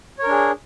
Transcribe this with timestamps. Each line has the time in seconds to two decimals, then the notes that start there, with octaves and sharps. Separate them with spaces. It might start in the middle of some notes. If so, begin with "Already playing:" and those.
0.19 C#5
0.23 A#4
0.27 D4
0.31 G#4